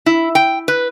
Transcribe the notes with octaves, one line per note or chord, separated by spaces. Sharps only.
E4
G5
B4